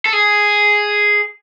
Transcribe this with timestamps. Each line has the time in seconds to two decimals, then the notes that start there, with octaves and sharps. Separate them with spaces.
0.06 A4
0.13 G#4